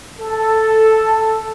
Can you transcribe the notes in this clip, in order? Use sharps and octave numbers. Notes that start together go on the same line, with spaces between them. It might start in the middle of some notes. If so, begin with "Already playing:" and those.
A4